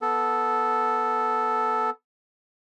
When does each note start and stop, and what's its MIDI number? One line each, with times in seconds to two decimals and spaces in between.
0.02 1.90 59
0.02 1.90 69